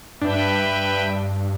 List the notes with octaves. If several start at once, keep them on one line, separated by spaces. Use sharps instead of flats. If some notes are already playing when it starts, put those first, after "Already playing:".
G2 D4 B4 E5 G5